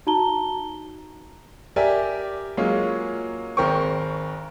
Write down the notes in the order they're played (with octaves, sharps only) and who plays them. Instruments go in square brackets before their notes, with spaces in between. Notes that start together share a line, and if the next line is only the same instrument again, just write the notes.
[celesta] D#4 F#4 A5 A#5 G7
[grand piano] G4 A#4 D5 E5 G#5
F#3 G#3 A#3 C#4 F4
G#1 A#4 C5 G5 C#6